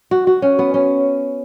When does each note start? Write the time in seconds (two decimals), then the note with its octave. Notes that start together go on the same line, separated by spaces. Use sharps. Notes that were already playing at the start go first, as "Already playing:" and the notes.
0.11 F#4
0.27 F#4
0.42 C#4
0.59 B3
0.74 C#4